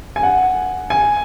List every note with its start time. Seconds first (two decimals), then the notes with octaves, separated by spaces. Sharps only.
0.16 G#5
0.23 F#5
0.90 G#5